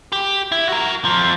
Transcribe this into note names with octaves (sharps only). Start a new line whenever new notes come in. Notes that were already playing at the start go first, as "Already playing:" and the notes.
G4
E4
F#4 A#4
F2 F3